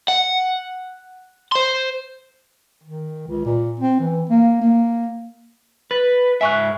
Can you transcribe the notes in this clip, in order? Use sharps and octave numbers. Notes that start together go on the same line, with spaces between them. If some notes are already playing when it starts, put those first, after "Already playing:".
F#5
C5 C6
D#3
C#2
A#2
C4
E3
A#3
A#3
B4 A6
G#2 E5 G#5 C#6 F#6